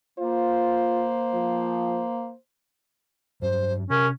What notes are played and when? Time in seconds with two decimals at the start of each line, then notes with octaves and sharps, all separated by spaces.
0.19 A#3 F4 C5
1.34 F3
3.42 G2 F#3 C5
3.90 C3 C#4 A#4